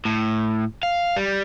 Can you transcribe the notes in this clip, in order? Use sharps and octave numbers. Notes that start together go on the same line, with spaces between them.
A2
F5
G3